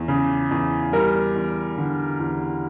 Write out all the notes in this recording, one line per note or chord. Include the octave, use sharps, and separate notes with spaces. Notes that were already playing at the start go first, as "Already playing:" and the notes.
Already playing: E2
C#3
E2
G3 A#4
E2
D3
E2